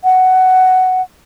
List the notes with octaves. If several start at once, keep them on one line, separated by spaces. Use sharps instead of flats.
F#5